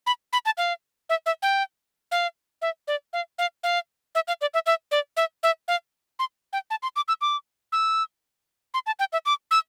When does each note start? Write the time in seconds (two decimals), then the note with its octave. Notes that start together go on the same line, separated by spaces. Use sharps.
0.07 B5
0.33 B5
0.46 A5
0.58 F5
1.09 E5
1.26 E5
1.42 G5
2.12 F5
2.62 E5
2.88 D5
3.13 F5
3.38 F5
3.64 F5
4.15 E5
4.28 F5
4.41 D5
4.54 E5
4.66 E5
4.91 D5
5.17 E5
5.43 E5
5.68 F5
6.19 C6
6.53 G5
6.71 A5
6.83 C6
6.96 D6
7.08 E6
7.21 D6
7.72 E6
8.74 C6
8.86 A5
8.99 G5
9.13 E5
9.26 D6
9.51 E6